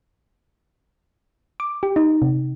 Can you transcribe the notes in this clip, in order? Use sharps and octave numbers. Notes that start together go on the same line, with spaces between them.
D6
G4
D#4
C3